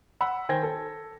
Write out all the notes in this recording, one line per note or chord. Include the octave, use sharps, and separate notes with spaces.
F#5 B5 E6
D#3 C5 G5 G#5 G#6 A#6
A4